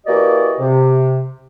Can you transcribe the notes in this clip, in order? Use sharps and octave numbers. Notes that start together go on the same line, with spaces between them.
E3 A#3 F#4 G4 D5 D#5
C3